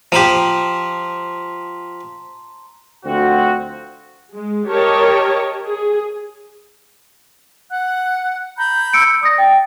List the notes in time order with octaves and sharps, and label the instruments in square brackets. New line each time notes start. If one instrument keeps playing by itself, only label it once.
[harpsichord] F3 G4 [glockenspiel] A5 A#5 C6
[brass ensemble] D2 F3 C4 F#4
[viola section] G#3
G4 A#4 C#5 D#5 A5
G#4
[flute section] F#5 F#6
A#5 B5 G6
[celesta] E6 C#7 D7
[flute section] D5 [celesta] D#6 A#6
[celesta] G5 A6